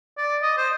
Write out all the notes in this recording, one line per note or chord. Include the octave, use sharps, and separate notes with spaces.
D5
D#5
C5